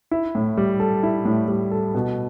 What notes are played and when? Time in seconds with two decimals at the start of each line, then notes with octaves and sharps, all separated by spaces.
0.11 E4
0.35 A2
0.57 G3
0.80 A4
1.03 E4
1.25 A2
1.48 G3
1.71 A4
1.94 B2